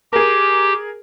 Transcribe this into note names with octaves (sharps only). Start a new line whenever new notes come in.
G4 G#4 A#4